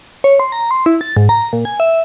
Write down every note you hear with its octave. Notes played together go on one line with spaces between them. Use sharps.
C#5
C6
A#5
C6
E4
A6
G#2
A#5
A#2
G#5
E5